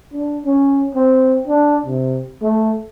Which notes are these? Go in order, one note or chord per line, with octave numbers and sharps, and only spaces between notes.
D4
C#4
C4
D4
C3
A3